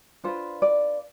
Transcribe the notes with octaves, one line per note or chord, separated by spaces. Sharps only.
D4 F4 B4 C5
D5